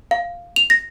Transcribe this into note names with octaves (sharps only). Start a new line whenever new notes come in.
F5
F7
A#6